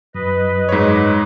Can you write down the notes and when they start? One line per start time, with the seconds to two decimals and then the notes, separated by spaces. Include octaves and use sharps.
0.14 F#2 B4 D#5
0.69 G#2 C#5